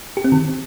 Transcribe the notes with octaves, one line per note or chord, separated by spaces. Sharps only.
G4
C4
D#3